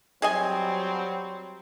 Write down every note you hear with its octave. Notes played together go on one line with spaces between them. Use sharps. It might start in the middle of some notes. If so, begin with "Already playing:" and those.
F#3 G3 C4 G#4 D#5 G#5